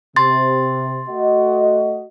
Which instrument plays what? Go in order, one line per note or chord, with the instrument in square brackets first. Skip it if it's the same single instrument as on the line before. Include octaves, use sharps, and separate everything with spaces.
[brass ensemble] C3 [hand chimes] C6 A6
[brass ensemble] A3 F#4 D#5